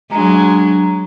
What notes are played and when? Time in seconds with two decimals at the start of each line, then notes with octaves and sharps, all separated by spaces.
0.11 F#3 G#3 D4 A#5